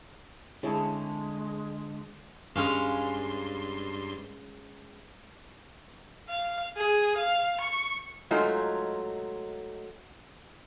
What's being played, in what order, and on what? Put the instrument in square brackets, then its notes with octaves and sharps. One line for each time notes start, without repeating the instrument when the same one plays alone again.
[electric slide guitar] D3 [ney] G#3 [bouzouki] C4 C#4 A5 [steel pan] E4 G#4 C#5
[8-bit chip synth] G2 C6 [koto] G#3 C#4 F5
[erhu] F5
G#4
F5
C#6
[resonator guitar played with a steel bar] F#3 G#3 A3 D#4 F4